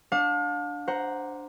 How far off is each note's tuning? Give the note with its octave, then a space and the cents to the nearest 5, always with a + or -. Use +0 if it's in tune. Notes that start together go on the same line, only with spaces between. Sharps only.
D4 +0 F5 +40
C5 +0 F#5 +0 A#5 +0